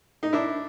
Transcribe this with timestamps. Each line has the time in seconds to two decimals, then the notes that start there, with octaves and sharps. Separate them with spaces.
0.23 D#4
0.33 D4 E4